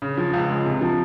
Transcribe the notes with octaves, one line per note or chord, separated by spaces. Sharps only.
C#3
F3
C#2
G#3
C3
F3